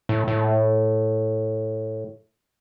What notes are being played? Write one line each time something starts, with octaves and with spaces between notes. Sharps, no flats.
A2
A2